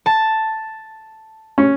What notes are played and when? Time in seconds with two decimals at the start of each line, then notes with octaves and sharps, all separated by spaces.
0.06 A5
1.58 C#4